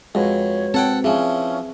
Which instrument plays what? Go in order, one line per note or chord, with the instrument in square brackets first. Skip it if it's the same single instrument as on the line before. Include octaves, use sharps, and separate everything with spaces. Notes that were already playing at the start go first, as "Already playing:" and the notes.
[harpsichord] F2 [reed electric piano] G#3 F#4 B4 [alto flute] C#5
[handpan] C4 [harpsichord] A4 F#5 G5
[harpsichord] E3 F3 [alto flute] C#4 [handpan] G#4